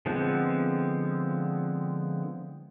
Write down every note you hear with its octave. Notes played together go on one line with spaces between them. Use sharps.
D3 F3 G#3 B3 C4